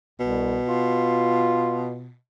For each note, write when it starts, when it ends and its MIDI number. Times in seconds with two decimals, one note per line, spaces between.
0.20 0.61 36
0.20 2.15 47
0.67 2.11 65